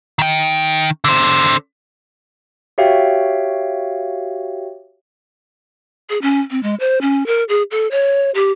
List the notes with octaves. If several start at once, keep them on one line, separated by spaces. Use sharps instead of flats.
D#3 G5
D3 C5
F#4 G4 C#5 E5 F5 G5
G#4
C#4
C4
G#3
C5
C#4
A#4
G#4
A4
C#5
G4